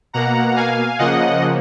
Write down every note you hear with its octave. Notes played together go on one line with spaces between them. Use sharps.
B2 A#3 F#5 A#5
F5 G#5
C#3 F3 A#3 D#5 F#5